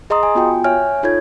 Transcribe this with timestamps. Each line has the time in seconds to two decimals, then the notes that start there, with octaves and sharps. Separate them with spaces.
0.10 G#4 D#5 A#5 C6 D#6
0.23 G#5
0.35 B3 F4 F#4 G5 G#5
0.64 C#5 E5 G#5 F6
1.03 D#4 F4 A4 C#5 G#6